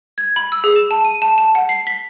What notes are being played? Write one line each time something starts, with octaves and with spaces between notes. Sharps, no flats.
G#6
B5
E6
G#4
E7
A5
D#7
A5
A5
F#5
C7
B6